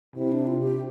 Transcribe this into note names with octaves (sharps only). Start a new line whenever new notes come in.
C3 E4
D4
F4
G4